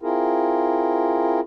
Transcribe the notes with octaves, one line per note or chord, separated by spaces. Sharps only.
C4 E4 F4 G#4 A#4